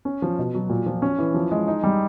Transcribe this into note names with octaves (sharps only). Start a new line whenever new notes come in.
C#4
F3
B2
F#3
A#2
F3
C#4
E3
F3
G#3
D#4
G3